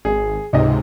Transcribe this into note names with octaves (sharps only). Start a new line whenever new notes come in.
G#1 G#4
C#2 G#2 C3 D#4 D#5